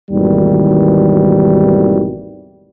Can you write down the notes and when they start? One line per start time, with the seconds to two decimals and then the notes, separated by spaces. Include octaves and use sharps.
0.10 G#1 D#2 B2 E3 G3